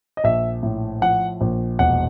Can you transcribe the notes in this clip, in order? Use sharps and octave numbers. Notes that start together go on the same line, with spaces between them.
D#5
A#1 E5
A2
F3 F#5
A#1
E1 F#5